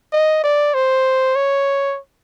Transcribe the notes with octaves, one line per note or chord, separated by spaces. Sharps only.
D#5
D5
C5
C#5